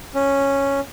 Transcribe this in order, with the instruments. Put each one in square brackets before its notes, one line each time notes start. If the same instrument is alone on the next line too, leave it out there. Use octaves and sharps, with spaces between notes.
[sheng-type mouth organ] C#4